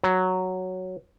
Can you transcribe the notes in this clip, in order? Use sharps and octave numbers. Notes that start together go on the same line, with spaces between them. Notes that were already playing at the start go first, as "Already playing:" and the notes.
F#3